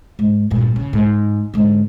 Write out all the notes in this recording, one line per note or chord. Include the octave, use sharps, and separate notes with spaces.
G#2
G2 A#2
C#3
G#2
G#2 D3